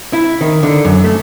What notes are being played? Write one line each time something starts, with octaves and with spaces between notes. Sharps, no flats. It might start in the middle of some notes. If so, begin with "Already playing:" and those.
E4
D#3
D3
F#2
A3